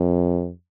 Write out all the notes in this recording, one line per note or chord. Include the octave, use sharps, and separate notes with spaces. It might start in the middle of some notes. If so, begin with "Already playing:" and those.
Already playing: F2